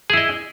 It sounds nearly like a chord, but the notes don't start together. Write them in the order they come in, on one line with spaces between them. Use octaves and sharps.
G#4 E4 D#5